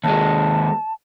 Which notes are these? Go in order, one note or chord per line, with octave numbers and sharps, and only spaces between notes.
D#2 G#3 A5